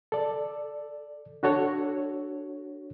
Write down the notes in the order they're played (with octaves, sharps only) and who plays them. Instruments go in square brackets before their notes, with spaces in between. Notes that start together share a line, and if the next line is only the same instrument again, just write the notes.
[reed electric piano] A4 D5
D4 F#4 A4 C#5